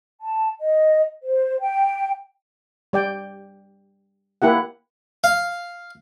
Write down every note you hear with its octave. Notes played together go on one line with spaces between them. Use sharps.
A5
D#5
C5
G5
G3 D5 G5
A#3 E4 G4 F#5
F5